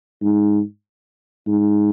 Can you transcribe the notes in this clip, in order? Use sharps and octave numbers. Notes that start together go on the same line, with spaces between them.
G#2
G#2